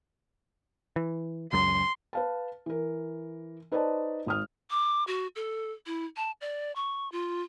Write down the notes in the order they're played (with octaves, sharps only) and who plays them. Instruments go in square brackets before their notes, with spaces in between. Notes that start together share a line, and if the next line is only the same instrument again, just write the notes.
[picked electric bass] E3
[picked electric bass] C#2 F#2 [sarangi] C6
[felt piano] B4 F5 A5
E3 A#4
D#4 B4 C5 D5 D#5 A5
G#1 D#6 F6
[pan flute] D6
F#4
A4
E4
A5
D5
C#6
F4